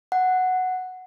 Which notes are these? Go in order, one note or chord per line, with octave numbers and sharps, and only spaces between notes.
F#5